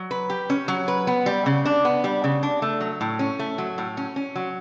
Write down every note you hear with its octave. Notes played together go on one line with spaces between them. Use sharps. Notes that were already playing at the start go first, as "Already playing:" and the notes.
Already playing: F#3
B4
G4
C#4
F#3
B4
B3
G3
C#3
D4
B3
G3
C#3
D4
A3
F#3
A2
C#4
A3
F#3
A2
C#4
C#4
F#3